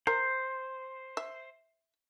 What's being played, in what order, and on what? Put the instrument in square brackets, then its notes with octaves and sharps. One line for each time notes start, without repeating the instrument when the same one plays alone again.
[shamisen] A#4 [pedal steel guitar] C5
[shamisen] E5